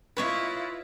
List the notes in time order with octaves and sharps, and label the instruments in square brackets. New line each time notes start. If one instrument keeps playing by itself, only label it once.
[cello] E4 F4 [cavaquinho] B4 C#5 D#5